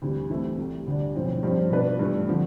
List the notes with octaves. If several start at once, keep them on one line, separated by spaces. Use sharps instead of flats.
D2 C3 E3 G3
C3 E3 A3 C4 E4
C2 C3 G3
D2 D3 G3 D4
B1 A2 F3 C4
G2 F3 C4
B2 B3 D4 F4 B4
G2 E3 A3
D3 F3 C4